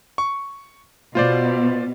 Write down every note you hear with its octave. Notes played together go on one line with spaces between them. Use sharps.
C#6
B2 F4 C5 D5